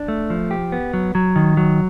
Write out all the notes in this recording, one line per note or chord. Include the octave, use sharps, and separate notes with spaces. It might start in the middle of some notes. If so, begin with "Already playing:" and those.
Already playing: D4
A3
F3
G4
B3
F#3
F#3
D#3
F#3